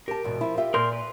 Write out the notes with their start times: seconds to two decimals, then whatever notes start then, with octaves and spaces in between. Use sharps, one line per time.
0.08 G4 A#4 A5
0.24 E2 G#2 B2
0.41 F3 E4
0.57 F4 G4 E5
0.74 A#2 A#4 C6 G6
0.93 B4